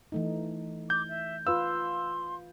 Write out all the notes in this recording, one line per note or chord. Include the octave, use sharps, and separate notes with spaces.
E3 A3 D#4
D6 G6
E5
F4 B4 F5 C6 E6